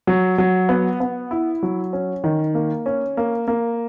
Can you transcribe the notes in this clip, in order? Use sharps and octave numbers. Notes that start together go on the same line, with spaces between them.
F#3
F#3
B3
B3
E4
F#3
C#4
D#3
A#3
C#4
A#3
A#3